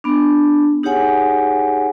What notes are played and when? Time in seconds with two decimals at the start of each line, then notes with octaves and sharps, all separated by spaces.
0.04 B3 D4
0.83 D#4 G4 G#4 C#5 F#5 G#5